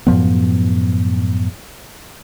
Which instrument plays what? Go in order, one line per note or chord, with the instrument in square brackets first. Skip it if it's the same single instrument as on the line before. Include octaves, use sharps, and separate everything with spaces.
[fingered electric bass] F#2 A2 F3 B3